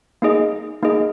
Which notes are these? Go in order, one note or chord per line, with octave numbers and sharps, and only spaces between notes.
A#3 D#4 G#4 D#5
A#3 D#4 G#4 D#5